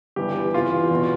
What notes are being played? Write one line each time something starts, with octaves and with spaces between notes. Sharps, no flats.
G1 G2 E3 G4
E2 C3 E3 F4
E2 B2